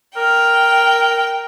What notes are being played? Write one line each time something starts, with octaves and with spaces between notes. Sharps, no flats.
A#4 G5